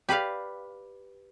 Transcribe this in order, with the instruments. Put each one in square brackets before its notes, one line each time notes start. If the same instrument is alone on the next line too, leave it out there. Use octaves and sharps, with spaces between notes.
[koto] G4 B4 D5 F5